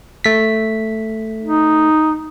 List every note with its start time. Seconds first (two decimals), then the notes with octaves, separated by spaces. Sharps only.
0.24 A3 B6
1.42 D#4